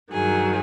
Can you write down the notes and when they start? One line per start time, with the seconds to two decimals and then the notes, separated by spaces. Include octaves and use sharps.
0.11 G2 D#3 F#3 G#4